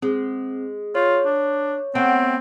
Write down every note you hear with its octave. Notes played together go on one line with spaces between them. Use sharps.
G#3 C4
F4 C#5
D4
A3 B3 C4 G5